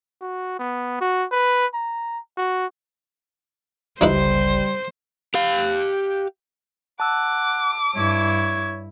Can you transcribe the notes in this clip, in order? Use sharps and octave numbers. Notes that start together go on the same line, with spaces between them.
F#4
B3
F#4
B4
A#5
F#4
G1 C#2 G3 D#4 E4 B4 C5
G4 F5
F#5 A5 D6 E6
G2 E4 C#5